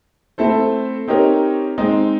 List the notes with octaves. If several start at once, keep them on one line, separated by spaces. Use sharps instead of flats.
A3 C4 E4 A4 C5
C4 D#4 G4 A#4 C#5
G#3 C4 D#4